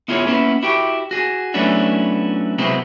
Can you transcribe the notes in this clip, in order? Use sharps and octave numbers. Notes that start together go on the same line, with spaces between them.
B3 E4 F4 G#4 B4 C#5
A#3 B3 C#4 E4
E4 F#4 G4 G5
F#4 G#4
F#3 A3 B3 C#4 D4 E4
C3 F#3 G#3 B3 C4 E4